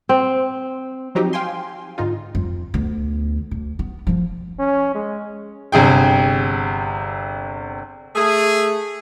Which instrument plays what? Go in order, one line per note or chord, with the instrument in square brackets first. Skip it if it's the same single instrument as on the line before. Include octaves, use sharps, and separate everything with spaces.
[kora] C4
[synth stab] F3 F#3 C4 D#4 F#4 G4
F5 G5 G#5 C6
G#2 D3 D#4 F4
[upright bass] F2
D2 B3
D2
B3
F3 A#3
[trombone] C#4
G#3
[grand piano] G1 C3 G#4 G5
[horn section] A3 G#4